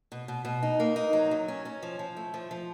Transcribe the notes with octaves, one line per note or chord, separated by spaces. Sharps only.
B2
B2
B2
D#4
A#3
D#4
F#3
F#3
C#4
C#4
F3
F3
A3
F3
F3